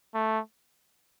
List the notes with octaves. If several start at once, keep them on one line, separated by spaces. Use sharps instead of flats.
A3